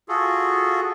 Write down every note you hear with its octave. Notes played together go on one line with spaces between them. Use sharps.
F4 F#4 G#4 A4